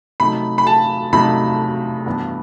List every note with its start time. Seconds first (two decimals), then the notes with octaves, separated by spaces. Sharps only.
0.20 C3 F#3 A3 D#4 B5
0.58 B5
0.67 A5
1.13 C3 F#3 A3 D#4 B5
2.06 G2 E3 B3